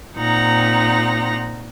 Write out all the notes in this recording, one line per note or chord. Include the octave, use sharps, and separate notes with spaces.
A#2 C4 D#4 F#5 A#5